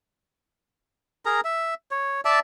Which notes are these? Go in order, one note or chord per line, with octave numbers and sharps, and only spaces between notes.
G#4 A#4 A#5
E5
C#5
D5 E5 A5